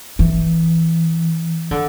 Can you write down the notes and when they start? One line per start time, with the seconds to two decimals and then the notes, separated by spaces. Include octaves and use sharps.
0.19 E3
1.71 D3